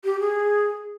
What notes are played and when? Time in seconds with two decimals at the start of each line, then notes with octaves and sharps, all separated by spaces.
0.04 G4
0.20 G#4